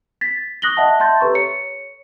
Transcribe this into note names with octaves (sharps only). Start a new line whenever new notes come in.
A6 B6
C#6 D#6 F#6 A#6 F#7 G7
D#5 E5 F#5 A5
E5 A5 C6 G6 A6
G4 A4 B4 A#5 C#6
C#5 C#7